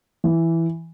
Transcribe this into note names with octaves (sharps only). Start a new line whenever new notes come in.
E3